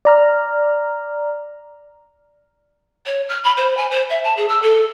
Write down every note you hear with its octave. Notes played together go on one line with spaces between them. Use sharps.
D5 A#5 F6
C#5
F6
B5
C5
G#5
C5
E5
A5
G#4
E6
A4